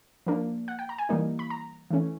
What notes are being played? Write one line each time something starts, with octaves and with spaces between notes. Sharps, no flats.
F3 A#3 D4
F#5
G5
A#5
G#5
E3 G3 A#3 D#4
B5
A#5
E3 A3 C#4